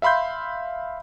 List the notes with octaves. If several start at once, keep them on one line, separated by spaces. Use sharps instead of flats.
E5 F5 B5 C6 G6